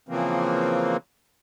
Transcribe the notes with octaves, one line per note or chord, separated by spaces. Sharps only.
C#3 E3 F3 A#3 C4